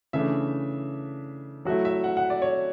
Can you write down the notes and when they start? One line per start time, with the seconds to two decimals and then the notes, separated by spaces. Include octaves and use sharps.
0.13 C#3 E3 A3 D4 E5
1.65 F#3 A3 E4 F#4
1.85 E5
2.04 F#5
2.17 F#5
2.30 D5
2.42 C#5